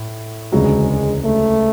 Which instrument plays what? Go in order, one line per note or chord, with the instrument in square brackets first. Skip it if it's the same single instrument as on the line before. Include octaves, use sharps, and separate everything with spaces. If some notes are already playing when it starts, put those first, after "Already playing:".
Already playing: [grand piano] A2
[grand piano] E1 D2 C#3 F#3 [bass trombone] G#3
[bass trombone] A3